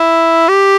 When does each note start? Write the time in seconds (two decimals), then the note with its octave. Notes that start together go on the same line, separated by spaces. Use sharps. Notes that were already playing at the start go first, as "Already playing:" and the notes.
Already playing: E4
0.48 G4